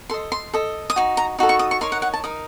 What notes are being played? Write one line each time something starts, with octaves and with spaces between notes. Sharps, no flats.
A4 D#5 C6
C6
A4 D#5
D#6
D#4 F#4
A#5
D#4 F#4 A4
C#6
D#6
C#6
D#4 A#4 C#5 C6
F#5
F#5
A5
D#4 A#4 D#6